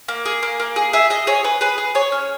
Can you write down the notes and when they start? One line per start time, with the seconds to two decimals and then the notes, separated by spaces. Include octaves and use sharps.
0.08 A#3
0.26 G#4
0.43 A#3
0.60 A#3
0.76 G#4
0.93 G#4 E5
1.10 G#4 D#5
1.27 G#4 C#5
1.44 G#4 B4
1.61 G#4 B4
1.78 G#4
1.95 G#4 C#5
2.12 C#4